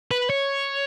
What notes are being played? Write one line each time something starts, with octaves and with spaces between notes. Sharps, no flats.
B4
C#5